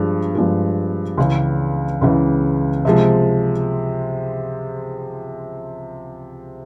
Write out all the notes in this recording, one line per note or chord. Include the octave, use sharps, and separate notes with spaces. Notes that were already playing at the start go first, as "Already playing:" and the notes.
Already playing: G2 F3 G#3
G2 F3 G#3
C#2 C#3 E3
C#2 C#3 E3
C3 F3 G#3